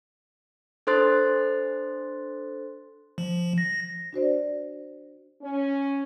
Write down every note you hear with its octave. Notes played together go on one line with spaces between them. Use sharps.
D4 A4 C5 C6 F#6 A6
F3
A#6
D4 F#4 C5 D5
C#4